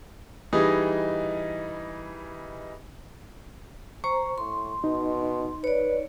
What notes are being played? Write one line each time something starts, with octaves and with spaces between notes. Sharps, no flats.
E3 G3 D#4 G#4 D#5
C5 A#5 C#6
A2 C6
B2 D#4
B4 C#5 D5